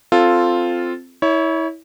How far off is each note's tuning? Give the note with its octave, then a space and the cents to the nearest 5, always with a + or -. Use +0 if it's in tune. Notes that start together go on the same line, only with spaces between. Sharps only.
C4 +0 F4 +0 A4 +0
E4 -25 C#5 +20